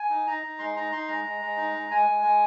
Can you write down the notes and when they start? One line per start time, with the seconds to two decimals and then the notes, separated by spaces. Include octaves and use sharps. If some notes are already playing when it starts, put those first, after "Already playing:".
Already playing: G#5
0.10 D#4
0.27 D#4 A#5
0.43 D#4
0.59 G#3 C6
0.76 D#4 A#5
0.92 D#4 C6
1.08 G#3 A#5
1.25 G#3
1.41 G#3
1.57 D#4
1.73 G#3
1.90 G#3 G#5
2.06 G#3
2.23 G#3